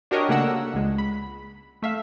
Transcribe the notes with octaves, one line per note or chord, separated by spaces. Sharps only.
D4 F#4 G4 A#4 C#5 D#5
C#3 A3 A#3 D4 F#5 E6
C#2 G#3
B5
A3 E5 F5